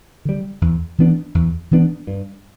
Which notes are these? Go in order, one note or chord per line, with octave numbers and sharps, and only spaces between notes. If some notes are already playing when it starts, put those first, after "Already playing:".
D3 G3
E2
E3 B3 D4
E2
E3 B3 D4
G2